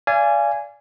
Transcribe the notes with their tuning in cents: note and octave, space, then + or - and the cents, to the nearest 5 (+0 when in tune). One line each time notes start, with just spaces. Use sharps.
D5 -20 F5 -35 G#5 +0